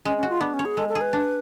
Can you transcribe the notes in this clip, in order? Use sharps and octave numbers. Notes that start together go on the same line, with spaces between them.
G#3 C#4
C#4
F#4
F4
B3 D4
C#4
C#5
G#4
G#3 A4
A4
G#4
B4
D4